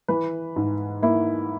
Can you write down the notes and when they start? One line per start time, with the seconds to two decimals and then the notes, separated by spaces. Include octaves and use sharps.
0.08 E3 B4
0.56 G#2
1.02 A#3 E4